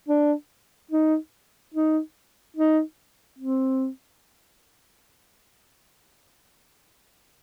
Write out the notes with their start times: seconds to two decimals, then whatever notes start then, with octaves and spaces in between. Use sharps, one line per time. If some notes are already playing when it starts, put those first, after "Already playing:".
0.08 D4
0.91 D#4
1.74 D#4
2.56 D#4
3.38 C4